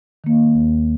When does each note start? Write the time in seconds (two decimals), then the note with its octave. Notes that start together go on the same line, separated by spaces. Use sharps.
0.24 D#3 A#3
0.54 D#2